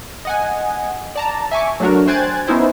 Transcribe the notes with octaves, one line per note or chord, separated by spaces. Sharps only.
D#5 F#5 G#5
D5 A5 A#5
E5 G#5 C#6 D6
F#3 A3 D4 F#4 A#4
C5 G5 G#5 F#6 G#6 A6
B3 C#4 D#4 E4 C5